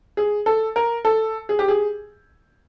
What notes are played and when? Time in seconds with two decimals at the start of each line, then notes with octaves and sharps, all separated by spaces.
0.17 G#4
0.46 A4
0.76 A#4
1.05 A4
1.49 G#4
1.59 G4
1.68 G#4